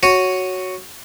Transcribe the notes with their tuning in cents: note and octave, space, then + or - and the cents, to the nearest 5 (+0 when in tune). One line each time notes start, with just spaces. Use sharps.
F#4 +0 C#5 +0 G#5 +0